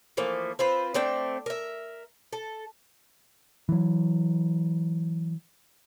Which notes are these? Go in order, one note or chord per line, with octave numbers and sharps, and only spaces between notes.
E3 F3 A3 A#3
C4 F4 B4 C5
A3 C4 D4 G5
A#4 E5
A4
E3 F#3